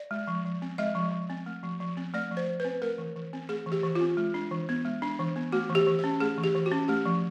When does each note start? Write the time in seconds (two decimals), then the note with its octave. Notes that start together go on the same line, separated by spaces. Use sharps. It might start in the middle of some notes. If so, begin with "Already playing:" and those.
Already playing: D5
0.11 G#3
0.28 F3
0.45 F3
0.62 C4
0.78 G#3 D#5
0.95 F3
1.12 F3
1.30 C4
1.46 A3
1.63 F3
1.80 F3
1.97 C4
2.14 A3 D5
2.31 F3
2.37 C5
2.48 F3
2.60 C4 B4
2.82 A3 A#4
2.98 E3
3.16 E3
3.33 C4
3.49 A3 G#4
3.66 E3
3.72 G4
3.83 E3
3.95 F4
4.01 C4
4.17 G#3
4.34 D4
4.51 E3
4.69 B3
4.85 G#3
5.02 D4
5.19 E3
5.36 B3
5.52 A3 F#4
5.69 E3
5.75 G4
5.87 E3
5.99 C#4 G4
6.20 A3 G#4
6.38 E3
6.43 G4
6.55 E3
6.66 F#4
6.72 C#4
6.88 A3 G4
7.06 F3